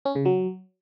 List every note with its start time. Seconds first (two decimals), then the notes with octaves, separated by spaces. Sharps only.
0.05 C#4
0.15 C#3
0.25 F#3